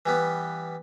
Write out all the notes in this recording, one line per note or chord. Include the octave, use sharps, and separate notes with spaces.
E3 G3 B3